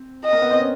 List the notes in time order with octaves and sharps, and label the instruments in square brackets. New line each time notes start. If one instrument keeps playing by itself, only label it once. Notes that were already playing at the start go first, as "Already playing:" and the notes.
Already playing: [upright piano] C4
[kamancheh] D#5
[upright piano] A#3
B3
C4
C#4